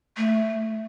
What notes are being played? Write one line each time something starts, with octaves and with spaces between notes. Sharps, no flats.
A3